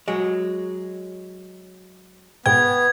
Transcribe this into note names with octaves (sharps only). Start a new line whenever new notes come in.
F#3 G#3
G#2 B2 B3 G5 G#6